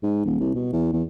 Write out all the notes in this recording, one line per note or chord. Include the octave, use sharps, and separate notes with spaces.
G#2
D#1
C2
B2
E2
E2